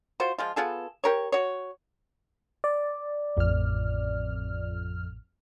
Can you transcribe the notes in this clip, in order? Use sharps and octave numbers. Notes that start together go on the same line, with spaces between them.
F4 F#4 C5
F3 G#3 F4
B3 F4 G#4 A4
G4 A#4 C#5
F#4 C#5
D5
A1 F2 F6